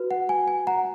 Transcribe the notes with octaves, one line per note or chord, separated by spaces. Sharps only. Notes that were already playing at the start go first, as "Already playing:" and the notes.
Already playing: F#4 B4
F#5
G#5
G#5
F#5 A#5